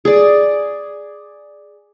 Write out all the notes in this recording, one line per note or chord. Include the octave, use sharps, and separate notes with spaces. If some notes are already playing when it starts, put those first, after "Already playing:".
G#4 D5